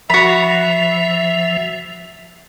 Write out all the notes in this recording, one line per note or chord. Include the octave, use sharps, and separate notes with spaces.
F3 F#4 E5 B5